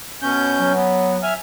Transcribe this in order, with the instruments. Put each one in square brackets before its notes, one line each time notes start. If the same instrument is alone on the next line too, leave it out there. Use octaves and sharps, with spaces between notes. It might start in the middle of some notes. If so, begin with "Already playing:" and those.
[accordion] B2 C#4 G6
[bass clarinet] F#3
[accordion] B3
E5 G#5 F6